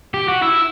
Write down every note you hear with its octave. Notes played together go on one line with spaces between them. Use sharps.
G4
F#4
E4